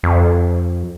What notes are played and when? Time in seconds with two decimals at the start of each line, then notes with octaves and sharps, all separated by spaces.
0.03 F2